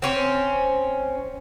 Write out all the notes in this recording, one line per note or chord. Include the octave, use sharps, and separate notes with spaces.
C4 C#4 C5